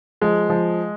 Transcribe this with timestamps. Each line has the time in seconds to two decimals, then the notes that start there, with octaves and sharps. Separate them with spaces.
0.22 F3 G#3
0.49 F3